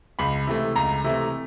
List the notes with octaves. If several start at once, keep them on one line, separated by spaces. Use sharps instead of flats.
C#2 B5
C3 E3 A3
C#2 A#5
C3 E3 A3